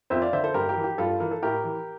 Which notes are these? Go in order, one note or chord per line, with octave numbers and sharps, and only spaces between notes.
F2 C5 E5
D5 F5
D3 C5 E5
A4 C5
G2 G4 A#4
G4 A#4
E3
G4
G2 F4 A4
E3 A#4
A4
A2 G4 A#4
E3